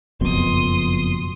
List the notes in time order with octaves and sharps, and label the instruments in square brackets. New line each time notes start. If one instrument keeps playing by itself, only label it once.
[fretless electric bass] F#1 F2 B2 [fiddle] C6 D#6